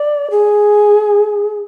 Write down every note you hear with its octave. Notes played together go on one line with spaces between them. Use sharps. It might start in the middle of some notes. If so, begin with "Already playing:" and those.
Already playing: D5
G#4